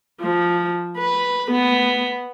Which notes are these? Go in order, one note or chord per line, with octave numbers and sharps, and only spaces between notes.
F3
B4
B3